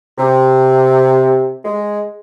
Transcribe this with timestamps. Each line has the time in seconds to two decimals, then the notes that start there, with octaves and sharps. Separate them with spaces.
0.18 C3
1.65 G#3